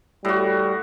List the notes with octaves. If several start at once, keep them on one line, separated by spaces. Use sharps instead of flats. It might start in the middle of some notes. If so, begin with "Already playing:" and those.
A2 G3 F#4